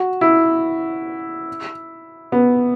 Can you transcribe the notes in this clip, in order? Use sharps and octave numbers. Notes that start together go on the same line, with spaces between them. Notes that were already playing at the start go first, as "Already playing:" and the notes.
Already playing: F#4
E4
B3